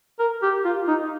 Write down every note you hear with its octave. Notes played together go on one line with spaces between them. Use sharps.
A#4
G4
F4
D#4